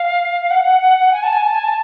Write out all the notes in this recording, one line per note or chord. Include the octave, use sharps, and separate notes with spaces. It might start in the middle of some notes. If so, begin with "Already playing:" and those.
Already playing: F5
F#5
G#5
A5
G#5
A5
G#5
A5